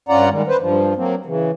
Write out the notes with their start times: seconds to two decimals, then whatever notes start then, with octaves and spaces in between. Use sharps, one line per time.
0.09 G2 C#4 F4 D5 F#5 A#5
0.30 D#3 G3 G#3
0.48 B4 C5
0.60 G2 F3
0.96 F#3 A#3 C4
1.26 C#3 E3